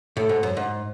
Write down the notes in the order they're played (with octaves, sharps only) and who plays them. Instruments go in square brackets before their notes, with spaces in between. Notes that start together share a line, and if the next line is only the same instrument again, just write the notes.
[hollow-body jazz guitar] A2 [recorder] A4
[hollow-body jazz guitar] G#2
F#2
G#2